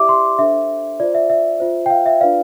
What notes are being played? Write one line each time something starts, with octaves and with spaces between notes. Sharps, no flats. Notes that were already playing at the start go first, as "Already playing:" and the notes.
Already playing: E4 G4 D5 E5 D6
C6
D4 A4 C5 E5
F4 C5 D5
E5
E5
F4 C5
G5
F5
E5
D4 F4 B4 D5 F5